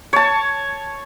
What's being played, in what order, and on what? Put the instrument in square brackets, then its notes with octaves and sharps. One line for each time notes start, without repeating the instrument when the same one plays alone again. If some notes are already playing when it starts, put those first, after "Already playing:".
[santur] C#5 A5